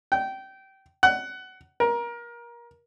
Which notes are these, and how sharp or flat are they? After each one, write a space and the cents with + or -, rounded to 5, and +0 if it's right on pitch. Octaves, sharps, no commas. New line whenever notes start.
G5 -20
F#5 +20
A#4 +25